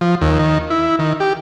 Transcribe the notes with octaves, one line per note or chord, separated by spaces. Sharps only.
F3
D#2
D#3
E4
D#3
G4